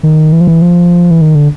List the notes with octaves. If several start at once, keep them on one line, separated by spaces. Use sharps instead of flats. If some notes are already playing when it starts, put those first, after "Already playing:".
D#3
E3
F3
E3
F3
E3
D#3
D3